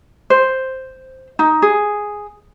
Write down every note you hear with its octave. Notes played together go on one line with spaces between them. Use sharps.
C5
D#4
G#4